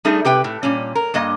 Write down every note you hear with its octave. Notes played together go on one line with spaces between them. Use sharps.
G3 A3 D#4 G#4
C3 G4 B4 G5
A2
A#2 G3 C#4
A#4
G2 A#3 D#5